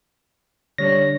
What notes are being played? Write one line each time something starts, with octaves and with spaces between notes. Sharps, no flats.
D3 G3 D4 C#5 A#6